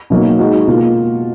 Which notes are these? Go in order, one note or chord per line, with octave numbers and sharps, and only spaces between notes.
B2 F#3 A#3 D#4
G#3 D#4 F#4
B2 A#3 F4